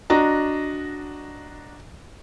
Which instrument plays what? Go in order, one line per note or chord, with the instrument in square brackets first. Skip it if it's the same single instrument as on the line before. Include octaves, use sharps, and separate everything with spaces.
[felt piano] D4 F#4 D#5 A#5